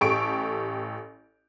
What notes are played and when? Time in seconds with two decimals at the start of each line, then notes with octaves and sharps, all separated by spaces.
0.01 A1 G4 A4 C#6 D7